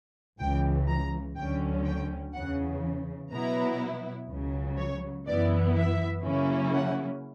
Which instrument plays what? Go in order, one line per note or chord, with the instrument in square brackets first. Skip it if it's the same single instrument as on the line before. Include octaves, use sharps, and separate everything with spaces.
[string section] C#2 C#3 E3 G5
A#5
D2 D3 F#3 C#4 G5
G5
E2 C#3 E3 F#5
B2 F#3 B3 E4 A#5
C#2 C#3 F#3
C#5
F#2 E3 B3 E4 D5
E5
C#3 F#3 A#3 C#4 E4
F#5